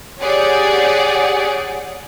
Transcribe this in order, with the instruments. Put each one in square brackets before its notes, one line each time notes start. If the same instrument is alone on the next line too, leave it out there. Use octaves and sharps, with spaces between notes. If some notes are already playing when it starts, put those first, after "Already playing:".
[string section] G4 G#4 C#5 D5 F#5 G#5